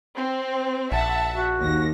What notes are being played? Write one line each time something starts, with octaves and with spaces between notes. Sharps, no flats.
C4
A#1 E5 F#5 A5
F#4
D#2 A#6